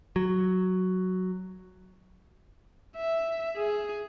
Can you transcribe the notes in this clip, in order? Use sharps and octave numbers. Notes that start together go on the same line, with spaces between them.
F#3
E5
G#4